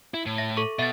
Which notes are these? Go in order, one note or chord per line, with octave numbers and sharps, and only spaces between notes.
E4
A2
E5 A#6
A4 C#6
B2 E5 A6